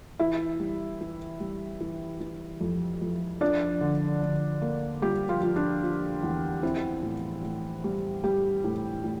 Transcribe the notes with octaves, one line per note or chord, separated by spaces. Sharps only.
E3 E4 E5
G3
E3
G3
E3
E3
F2
F2
F3 D4 D5
D3
D3
A#3
F3 G3 G4
F3 F4
F3
D4
F3
E2
C4 E4
A2
A2
G3
G3 G4
A2
A2